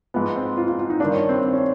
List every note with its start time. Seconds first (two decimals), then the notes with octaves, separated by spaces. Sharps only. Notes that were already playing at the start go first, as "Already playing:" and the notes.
0.14 G#2 F3 B3
0.36 C4
0.57 F4
0.68 F4
0.79 F4
0.90 D#4
1.00 G2 D#3 D4
1.15 C#4
1.29 C4
1.43 C4
1.53 C#4